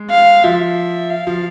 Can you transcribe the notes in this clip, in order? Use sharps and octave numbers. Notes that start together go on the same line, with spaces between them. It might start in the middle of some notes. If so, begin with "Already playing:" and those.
Already playing: G#3
F5
F3 E5
F5
F3